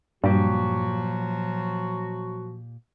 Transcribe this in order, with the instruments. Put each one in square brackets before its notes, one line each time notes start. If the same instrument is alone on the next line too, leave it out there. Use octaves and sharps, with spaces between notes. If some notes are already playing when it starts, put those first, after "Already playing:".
[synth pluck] G2 [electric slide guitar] A#2 G4 [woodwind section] F3 F#3 F#4